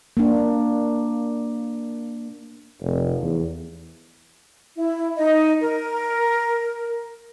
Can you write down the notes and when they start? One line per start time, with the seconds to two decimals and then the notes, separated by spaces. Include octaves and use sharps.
0.17 A#3 D4
2.82 F1
3.22 E2
4.77 E4
5.17 D#4 D#5
5.61 A#4